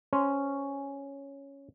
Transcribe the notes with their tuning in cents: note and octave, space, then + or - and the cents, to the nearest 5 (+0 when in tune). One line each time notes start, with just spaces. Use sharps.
C#4 +0 C5 +0